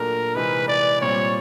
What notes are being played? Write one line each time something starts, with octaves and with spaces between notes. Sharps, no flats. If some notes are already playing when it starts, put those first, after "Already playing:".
Already playing: A#2 F#3 A3 D4 A#4
C3 E3 G#3 C4 D#4 B4
D5
A#2 G3 C4 C#5